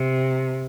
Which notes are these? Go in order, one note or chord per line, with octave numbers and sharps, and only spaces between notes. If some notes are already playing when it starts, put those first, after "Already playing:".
Already playing: C3